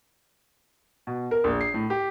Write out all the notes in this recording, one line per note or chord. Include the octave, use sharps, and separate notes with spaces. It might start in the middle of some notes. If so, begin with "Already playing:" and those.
B2
A#4
A#1
C7
A2
G4